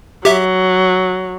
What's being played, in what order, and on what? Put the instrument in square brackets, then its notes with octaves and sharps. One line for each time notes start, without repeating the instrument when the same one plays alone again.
[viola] F#3 [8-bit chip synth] G4 E5